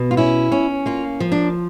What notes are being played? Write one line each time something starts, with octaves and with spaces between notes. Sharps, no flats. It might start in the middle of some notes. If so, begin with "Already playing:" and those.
Already playing: B2
F4
C#4 E4
C#4
A#3 F4
F3
D4